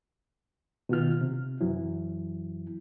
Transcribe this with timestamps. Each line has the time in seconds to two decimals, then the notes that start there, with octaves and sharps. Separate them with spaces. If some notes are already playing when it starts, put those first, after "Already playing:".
0.89 B2 D#3 F4 F6
1.21 C3
1.61 F#2 E3 F#3 E4